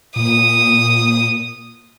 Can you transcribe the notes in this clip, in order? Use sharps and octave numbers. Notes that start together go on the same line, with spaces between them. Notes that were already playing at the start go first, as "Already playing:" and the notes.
A#2 D#6